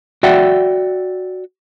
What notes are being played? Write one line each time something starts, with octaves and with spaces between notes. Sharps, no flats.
F#4 D5 E5 F#5 G5